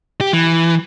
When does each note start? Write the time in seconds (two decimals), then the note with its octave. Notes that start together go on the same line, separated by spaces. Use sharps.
0.21 G4
0.33 E3